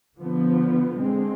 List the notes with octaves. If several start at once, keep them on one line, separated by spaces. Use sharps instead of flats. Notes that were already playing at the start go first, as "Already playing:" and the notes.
D3 F3 B3
D3 G#3 C4